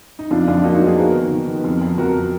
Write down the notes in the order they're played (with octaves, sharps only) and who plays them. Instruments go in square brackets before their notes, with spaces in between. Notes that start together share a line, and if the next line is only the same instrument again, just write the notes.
[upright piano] D#4
F2 D4 F4
F2 D4 F4
F4
A#3 D#4 F#4
D#4 F#4
F3
F4 G#4
B3 F#4 A#4
D#3
D#3
B3
F2
F2
F2 F#4 A#4